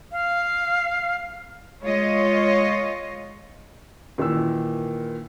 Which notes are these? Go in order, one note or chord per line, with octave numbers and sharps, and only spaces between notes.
F5
G#3 F4 C#5 D#5
A#2 D#3 E3 E6